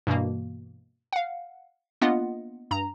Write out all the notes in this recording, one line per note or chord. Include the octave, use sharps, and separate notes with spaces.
G2 B2 E3 A#3
F5 F#5
A#3 B3 D4 F4 D#5 F#5
G2 A#5